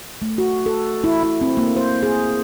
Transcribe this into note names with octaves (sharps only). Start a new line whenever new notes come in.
A3
F#4
A4
E4
E4
C4
A#3
C5
G#4